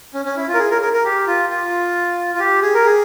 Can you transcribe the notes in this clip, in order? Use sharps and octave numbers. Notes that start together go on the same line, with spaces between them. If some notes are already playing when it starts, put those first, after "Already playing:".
C#4
C#4
E4
F4
A#4
G#4
A#4
A#4
A#4
G4
F4
F4
F4
G4
G#4
A#4
G#4